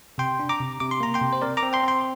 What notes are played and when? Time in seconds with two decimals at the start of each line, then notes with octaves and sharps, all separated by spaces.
0.18 C3 G5 C6
0.40 D4
0.49 A#5 D6
0.60 C3
0.80 C3 D6
0.91 C6
1.00 A#3 A#5
1.14 G5 C6
1.22 C3
1.33 C5
1.42 C4 A#4 D5
1.57 A#5 D6
1.63 C4
1.73 G5 C6
1.83 C4 G5 C6